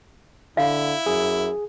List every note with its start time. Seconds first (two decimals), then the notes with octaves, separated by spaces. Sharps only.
0.57 D3 E4 F5
1.06 F#2 G#4